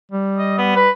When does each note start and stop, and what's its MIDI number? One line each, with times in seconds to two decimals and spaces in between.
0.12 0.88 55
0.38 0.57 75
0.58 0.72 59
0.76 0.90 71